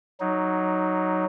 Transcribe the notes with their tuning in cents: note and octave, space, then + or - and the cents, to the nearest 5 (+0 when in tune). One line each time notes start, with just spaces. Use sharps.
F#3 +0 D#4 +0